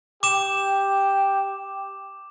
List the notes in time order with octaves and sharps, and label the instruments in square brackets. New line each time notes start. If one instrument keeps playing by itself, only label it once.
[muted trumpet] G4 [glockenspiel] D6 E7